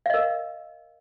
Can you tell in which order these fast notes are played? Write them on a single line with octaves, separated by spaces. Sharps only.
F5 D#5 A#4